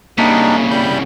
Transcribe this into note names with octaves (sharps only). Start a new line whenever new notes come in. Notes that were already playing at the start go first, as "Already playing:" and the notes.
C2 C#3 G3 A#3 D4 D#4 B6
G3 B5 G6